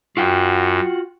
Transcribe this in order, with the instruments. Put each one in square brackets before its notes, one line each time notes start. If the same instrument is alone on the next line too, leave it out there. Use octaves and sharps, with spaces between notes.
[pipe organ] F#2 [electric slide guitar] F4 F#4 G5